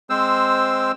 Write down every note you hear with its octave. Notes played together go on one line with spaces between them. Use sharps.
G#3 C4 C5 E6